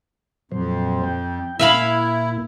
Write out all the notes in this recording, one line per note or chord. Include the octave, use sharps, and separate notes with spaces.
F2 A#2 F#3 C5
G5
A#2 A#3 E4 E5 F5 B5